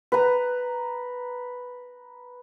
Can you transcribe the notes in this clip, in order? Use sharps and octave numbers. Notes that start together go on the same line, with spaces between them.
B4 A#5